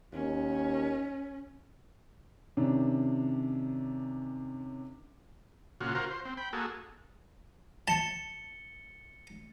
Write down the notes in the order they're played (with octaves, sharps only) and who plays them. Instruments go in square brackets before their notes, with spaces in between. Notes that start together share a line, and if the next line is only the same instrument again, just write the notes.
[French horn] D#2 [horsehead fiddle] C#4
[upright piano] C3 D#3 C#4 D4
[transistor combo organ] A#2 C#3 F4 F#4
F4 F#4 A#4 C5
C5
C4
G5 B5
A#3 F#4 G#4 A4
[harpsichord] A5 [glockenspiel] A6 C#7 G7